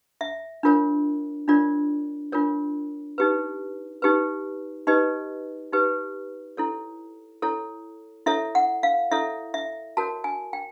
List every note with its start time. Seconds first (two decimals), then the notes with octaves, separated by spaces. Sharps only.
0.21 E5
0.63 D4 F4 A#4 C#5
1.48 D4 F4 A#4 C#5 D5
2.32 D4 F4 A#4 C#5
3.18 D#4 G4 B4
4.02 D#4 G4 B4
4.87 D#4 G4 B4 D#5
5.72 D#4 G4 B4
6.57 E4 A4 C#5
7.42 E4 A4 C#5
8.26 E4 A4 C#5 E5
8.55 F#5
8.83 F5
9.11 E4 A4 C#5 E5
9.54 E5
9.97 F#4 A#4 C#5 A5
10.24 G#5
10.53 G5